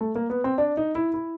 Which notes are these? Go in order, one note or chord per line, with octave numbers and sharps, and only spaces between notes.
A3
A#3
B3
C4
D4
D#4
E4
E4